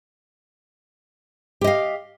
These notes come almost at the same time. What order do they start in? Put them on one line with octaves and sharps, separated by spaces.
G4 D#5 F5